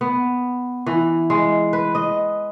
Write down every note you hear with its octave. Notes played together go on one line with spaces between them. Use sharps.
B3
E3
G#3
B4
D#5